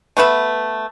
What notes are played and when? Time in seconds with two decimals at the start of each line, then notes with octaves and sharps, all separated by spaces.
0.17 A3 B3 B4 E5